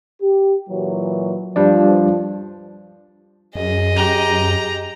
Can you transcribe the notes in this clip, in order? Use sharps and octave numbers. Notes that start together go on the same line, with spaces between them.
G4
A#2 E3 F#3
F3 G3 D4 D5
F#2 G#4 D#5
G4 A#5